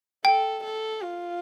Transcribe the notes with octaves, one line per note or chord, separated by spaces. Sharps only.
A4 G5
A4
F4